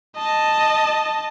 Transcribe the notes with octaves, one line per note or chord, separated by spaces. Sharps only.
D#5 A5